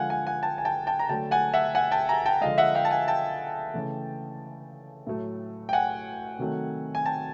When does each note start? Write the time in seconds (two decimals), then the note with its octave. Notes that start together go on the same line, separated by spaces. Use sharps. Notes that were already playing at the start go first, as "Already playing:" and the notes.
Already playing: D3 F3 G#3 F5 F#5 G#5
0.10 F#5 G#5
0.26 F#5 G#5
0.42 G5 A5
0.58 G#5
0.65 G5 A5
0.87 G5 A5
0.99 A#5
1.09 D3 F#3 A3 G5 A5
1.31 F#5 G#5
1.54 E5 F#5
1.75 F#5 G#5
1.91 G5 A5
2.09 G#5 A#5
2.25 G5 A5
2.41 D3 F3 G#3 D#5 F5
2.58 E5 F#5
2.75 F5 G5
2.85 A5
2.91 F#5 G#5
3.08 G5 A5
3.74 C#3 E3 A3
5.07 A2 F#3 A3
5.69 G5
5.73 F#5 G#5
6.39 C3 D#3 F#3 A3
6.95 G#5
7.06 G5 A5